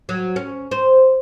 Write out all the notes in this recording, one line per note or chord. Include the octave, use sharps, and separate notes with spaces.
F#3
C#4
C5